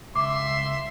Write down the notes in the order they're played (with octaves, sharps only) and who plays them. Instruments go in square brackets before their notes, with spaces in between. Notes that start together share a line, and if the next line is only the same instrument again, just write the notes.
[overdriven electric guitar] C#2 [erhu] E5 [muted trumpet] C6 [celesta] D6